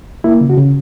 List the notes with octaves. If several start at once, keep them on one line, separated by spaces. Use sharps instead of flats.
A#3 E4
C#3
F#4
C#3